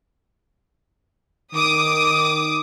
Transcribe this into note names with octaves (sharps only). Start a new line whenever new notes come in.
D#3 D6 D#6